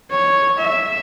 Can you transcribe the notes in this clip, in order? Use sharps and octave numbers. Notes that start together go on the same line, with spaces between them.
C#5
E5